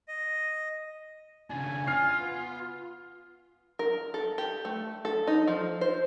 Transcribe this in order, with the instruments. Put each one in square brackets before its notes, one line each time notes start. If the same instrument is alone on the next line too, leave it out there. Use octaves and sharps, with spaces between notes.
[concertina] D#5
[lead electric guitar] C#3 D4 [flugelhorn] G#5
[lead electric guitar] F4 [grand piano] F6 C7
[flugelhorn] B3
[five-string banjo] A#4
A4
G4
A3
A4
D#4
F3
C5